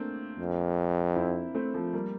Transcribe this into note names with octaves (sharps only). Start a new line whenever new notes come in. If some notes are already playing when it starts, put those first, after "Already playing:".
Already playing: A3 A#3 C4 D4
F2
C4 E4
A3 C4
F3 A3
G3 A#3